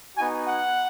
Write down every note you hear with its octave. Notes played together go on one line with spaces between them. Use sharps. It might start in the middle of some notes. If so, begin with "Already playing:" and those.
B3 D#4 F#4 G#5
F#5